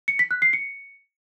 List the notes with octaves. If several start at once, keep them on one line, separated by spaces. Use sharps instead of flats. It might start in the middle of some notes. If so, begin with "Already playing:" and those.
C#7
B6
F#6
C7
C#7